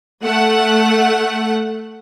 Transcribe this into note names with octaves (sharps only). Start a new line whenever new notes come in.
A3 F#5